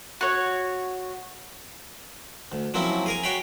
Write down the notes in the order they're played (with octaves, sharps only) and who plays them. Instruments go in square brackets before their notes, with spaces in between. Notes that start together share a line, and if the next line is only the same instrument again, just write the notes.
[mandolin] F#4 C#5
[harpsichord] D2
F3 F#3 A#3 C4 C#4 E4
G#4 A#4 G#5
F#4 C#5 F5 G5 B5